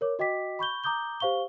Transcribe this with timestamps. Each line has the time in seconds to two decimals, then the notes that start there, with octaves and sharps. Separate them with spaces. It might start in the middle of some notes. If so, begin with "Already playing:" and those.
0.01 A#4 C#5 D6
0.19 F#4 D#5 G5 D6 B6
0.59 B5 C#6 G6 G7
0.84 A#5 D6 D#6 G6 G7
1.20 G4 C5 F5 C#6 G7